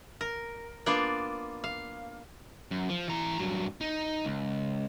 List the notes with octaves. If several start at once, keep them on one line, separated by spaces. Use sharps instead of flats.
A#4
A#3 B3 D4 F4 D5
F5
F#2
F3
E3 A#5
G2 F#3
D#4
C#2